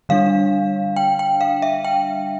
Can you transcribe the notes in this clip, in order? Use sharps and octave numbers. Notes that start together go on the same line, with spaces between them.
D3 G3 D4 F5
G5
G5
F5
E5
G5